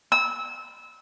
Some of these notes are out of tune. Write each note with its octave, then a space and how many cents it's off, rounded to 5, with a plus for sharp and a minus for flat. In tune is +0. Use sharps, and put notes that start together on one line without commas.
E6 -25